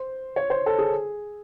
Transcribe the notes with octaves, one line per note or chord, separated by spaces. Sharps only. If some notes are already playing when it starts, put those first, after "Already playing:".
Already playing: C5
C#5
C5
A4
G#4